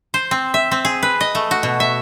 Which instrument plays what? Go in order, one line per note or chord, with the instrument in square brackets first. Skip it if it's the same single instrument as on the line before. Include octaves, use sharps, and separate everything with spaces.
[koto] C5
C4
E5
C4
G#4
B4
D#5
A3
F#4
B2
E5